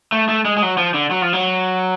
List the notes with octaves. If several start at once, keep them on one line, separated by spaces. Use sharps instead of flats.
A3
A3
G#3
G#3
F#3
F3
D3
F#3
F3
F#3